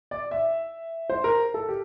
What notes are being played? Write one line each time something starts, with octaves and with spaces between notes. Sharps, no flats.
D5
E5
C5
A#4
A4
G4